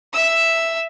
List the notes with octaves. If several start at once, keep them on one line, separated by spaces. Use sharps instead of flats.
E5 E6